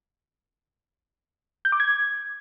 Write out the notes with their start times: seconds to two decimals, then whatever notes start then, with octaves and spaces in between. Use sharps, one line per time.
1.65 G6
1.72 D6
1.80 G#6